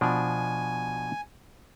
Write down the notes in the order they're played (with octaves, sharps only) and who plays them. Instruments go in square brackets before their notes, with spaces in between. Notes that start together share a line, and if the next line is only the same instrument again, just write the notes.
[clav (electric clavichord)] B2 F3 D4 [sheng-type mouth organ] G#5